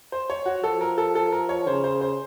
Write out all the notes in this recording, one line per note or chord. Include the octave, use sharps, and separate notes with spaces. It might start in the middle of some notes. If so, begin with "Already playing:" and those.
C5
C#5
F#4
F3 A4
A#4
A4
A4
A#4
C#5
C#3 C5
C5
C5